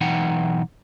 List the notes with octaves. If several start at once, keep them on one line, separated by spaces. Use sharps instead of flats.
B1 E3 D#4 F#5 G5